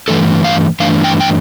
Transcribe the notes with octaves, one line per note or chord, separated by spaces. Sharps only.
G2 E3 A3 D4 A4
F5
G2 E3 A3 D4 F5
G5
G5